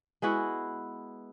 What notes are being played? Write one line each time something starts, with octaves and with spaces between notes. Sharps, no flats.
G#3 B3 E4 F#4